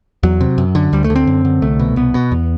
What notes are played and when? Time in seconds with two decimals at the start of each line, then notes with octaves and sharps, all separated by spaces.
0.23 E2 F#3
0.41 C3
0.58 F#2
0.75 D3
0.93 D2 G3
1.04 A3
1.10 D3
1.16 C4
1.27 F#2
1.45 D3
1.62 C2 A3
1.80 B2
1.96 C2 B3
2.14 B2
2.32 E2